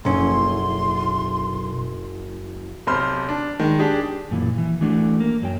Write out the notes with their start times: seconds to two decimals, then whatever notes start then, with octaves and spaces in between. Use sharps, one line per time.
0.05 F#1 B1 C#4 E4 C6
2.87 B1 C3 C5 B5 C6 F6
3.29 D4
3.59 D#3 G#3
3.79 D4 G4 G#4
4.31 F#2 A#2 E3
4.58 E3
4.81 E3 A3 D4 F#4
5.20 A#3
5.42 F#2 F#3 G5